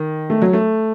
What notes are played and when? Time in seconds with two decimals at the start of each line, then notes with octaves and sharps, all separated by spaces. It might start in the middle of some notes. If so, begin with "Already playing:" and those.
Already playing: D#3
0.30 A3
0.42 F#3
0.53 A3